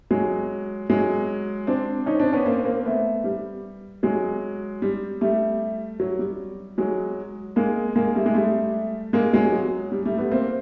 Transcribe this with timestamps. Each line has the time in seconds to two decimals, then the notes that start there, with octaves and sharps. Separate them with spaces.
0.11 F#3 G#3
0.90 F#3 G#3
1.67 C4 D4
2.06 C#4 D#4
2.20 C4 D4
2.33 B3 C#4
2.46 A#3 C4
2.65 A#3 C4
2.85 A3 B3
3.24 G3
4.03 F#3 G#3
4.82 G3
5.21 G3 A3
6.00 F#3
6.19 G3
6.78 F#3 G#3
7.56 G#3 A#3
7.96 G#3 A#3
8.15 G3 A3
8.26 G#3
8.35 G3 A3
9.13 G#3 A#3
9.33 F#3 G#3
9.52 F#3
9.92 G3
10.05 G3 A3
10.18 A3 B3
10.32 A#3 C4